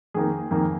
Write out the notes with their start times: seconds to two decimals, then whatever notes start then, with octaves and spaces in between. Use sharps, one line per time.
0.14 F2 D#3 A#3 G#4
0.51 F2 D#3 A#3